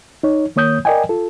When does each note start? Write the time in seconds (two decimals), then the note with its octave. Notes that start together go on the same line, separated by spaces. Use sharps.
0.23 D#4 C#5
0.56 D#3 A#3 C#5 D#6 G6
0.85 A#4 D5 D#5 G5 G#5
1.09 F4 A4